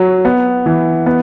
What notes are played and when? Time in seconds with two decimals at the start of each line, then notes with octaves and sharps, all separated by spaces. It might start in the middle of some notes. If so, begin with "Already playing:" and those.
Already playing: F#3
0.25 B3
0.66 E3
1.06 B3